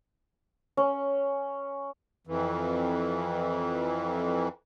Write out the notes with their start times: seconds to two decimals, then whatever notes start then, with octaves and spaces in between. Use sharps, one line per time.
0.77 C#4
2.27 F2 E3